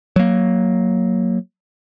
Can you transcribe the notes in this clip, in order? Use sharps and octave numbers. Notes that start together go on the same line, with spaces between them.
F#3 A#3